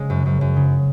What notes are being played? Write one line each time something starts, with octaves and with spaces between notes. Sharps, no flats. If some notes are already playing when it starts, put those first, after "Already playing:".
Already playing: C#3 G#3
F#2
F#2
F#2
C#3